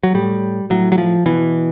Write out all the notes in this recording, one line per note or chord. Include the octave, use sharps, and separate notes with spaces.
F#3
A2 G3
A2 F#3
F#3
F3
B2 E3